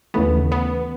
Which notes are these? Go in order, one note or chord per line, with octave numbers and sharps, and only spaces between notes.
D#2 C#3 E3 A3 B3
B3